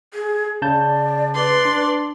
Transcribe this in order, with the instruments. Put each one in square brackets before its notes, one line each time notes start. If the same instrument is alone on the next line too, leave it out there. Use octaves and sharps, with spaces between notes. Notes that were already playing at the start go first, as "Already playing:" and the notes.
[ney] G#4
[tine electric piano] C#3 A5 G6 [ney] D5
[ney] B4 [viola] D5 C6
[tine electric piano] D4